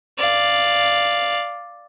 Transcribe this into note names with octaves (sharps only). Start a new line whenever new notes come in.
D5 F5